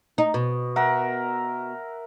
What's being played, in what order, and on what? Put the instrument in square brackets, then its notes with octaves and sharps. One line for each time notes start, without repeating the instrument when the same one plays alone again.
[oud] D#4
B2
[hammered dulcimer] A#4 E5 F#5